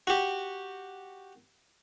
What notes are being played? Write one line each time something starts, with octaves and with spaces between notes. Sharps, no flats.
F#4 G4